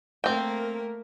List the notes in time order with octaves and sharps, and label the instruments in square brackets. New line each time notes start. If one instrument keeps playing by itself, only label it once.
[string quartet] A3 A#3 A#4 [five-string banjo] C4 G5